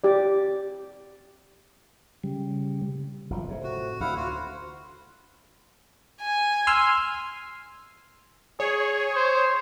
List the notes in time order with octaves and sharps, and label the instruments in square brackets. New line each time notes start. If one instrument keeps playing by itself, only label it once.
[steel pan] G4 D5
[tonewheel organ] C#3 G3
[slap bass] F#1 C3 F3
A2 C3
[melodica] F#4
[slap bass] D2 [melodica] E4 F5 F#5
[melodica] F4 F#4
[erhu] G#5
[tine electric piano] C6 E6 F6
[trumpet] G#4 [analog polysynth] C#5
[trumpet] C5